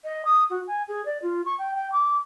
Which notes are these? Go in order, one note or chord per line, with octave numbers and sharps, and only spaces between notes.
D#5
D#6
F#4
G#5
G#4
D5
F4
C#6
G5
G5
D6